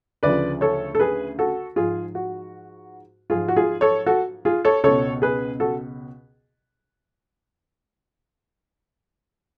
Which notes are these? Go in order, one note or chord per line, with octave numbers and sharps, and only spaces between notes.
D2 C#3 F3 B4 D5
A4 C#5
A4
G#4 B4
F#4 A4
G#2 F3 F4 G#4
F#4
G#2 F3 F4 G#4
F#4
F4 G#4
A4 C#5
F#4 A4
F4 G#4
A4 C#5
C#2 B2 A4 C#5
G#4 B4
F#4 A4